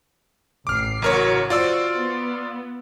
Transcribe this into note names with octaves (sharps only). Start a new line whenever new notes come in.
A1 D6 F6 C7
A1 C#3 F#3 F#4 A#4 C#5
F4 F#4 C5 D5 E6
B3